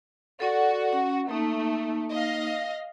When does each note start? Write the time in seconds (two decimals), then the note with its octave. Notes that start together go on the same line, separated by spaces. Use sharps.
0.40 F#4 A4 D5
0.93 C#4 F#5
1.28 A3 A#3 D#4
2.11 D#5 F5 A#6